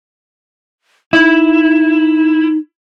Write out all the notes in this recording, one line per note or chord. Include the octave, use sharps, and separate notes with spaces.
D#4 E4